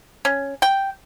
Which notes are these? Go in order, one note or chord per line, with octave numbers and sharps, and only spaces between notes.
C#4
G5